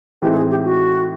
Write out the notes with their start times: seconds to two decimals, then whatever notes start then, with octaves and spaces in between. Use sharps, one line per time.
0.22 A2 E3 G#3 C4 D#4 G4
0.31 A4
0.36 G#4
0.50 G4
0.64 F#4